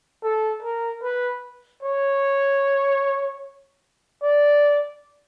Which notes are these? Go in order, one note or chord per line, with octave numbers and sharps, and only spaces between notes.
A4
A#4
B4
C#5
D5